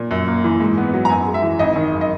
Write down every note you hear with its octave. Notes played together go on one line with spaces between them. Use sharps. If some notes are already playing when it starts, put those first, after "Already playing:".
Already playing: A#2
F#2
A#3
E3
G#2
B3
F#3
A#5
F#2 G#5
G#3
E5
E3
G#1 D#5
D#3
F#2
D#5